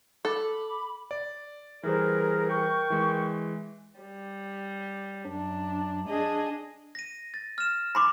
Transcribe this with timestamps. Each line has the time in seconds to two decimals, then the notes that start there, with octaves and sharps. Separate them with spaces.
0.25 A4 B5 D6
1.11 D5
1.83 E3 G3 G#4 A#4 C5
2.49 A#4 G5 C#6
2.90 E3 G#3
4.01 G3
5.27 F#2 D4
6.08 D4 G#4 D#5
6.95 A#6 D#7
7.34 A6
7.58 F6 E7
7.95 B5 C6 D6